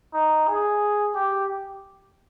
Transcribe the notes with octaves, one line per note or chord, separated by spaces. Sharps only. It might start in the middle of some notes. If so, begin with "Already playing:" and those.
D#4
G#4
G4